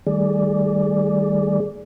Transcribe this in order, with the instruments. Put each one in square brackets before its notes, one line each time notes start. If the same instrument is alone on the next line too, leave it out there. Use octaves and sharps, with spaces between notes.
[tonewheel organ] D#3 G3 A3 G#4 D5